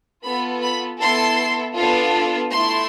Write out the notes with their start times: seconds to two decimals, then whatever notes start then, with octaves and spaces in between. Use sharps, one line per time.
0.23 B3 F4 A4 B5
0.62 B5
0.99 B3 E4 A4 C6
1.75 B3 D4 F4 A4
2.51 A3 E4 A4 C6